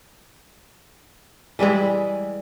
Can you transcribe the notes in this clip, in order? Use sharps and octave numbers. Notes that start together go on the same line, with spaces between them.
E3 G3 G#3 E4